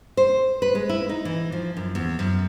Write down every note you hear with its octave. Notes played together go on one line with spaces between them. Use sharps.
C5
B4
G#3
E4
D#4
E3
F3
F#2
E2
F#2